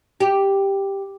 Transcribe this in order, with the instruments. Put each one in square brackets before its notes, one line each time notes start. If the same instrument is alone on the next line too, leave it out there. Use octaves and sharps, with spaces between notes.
[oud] G4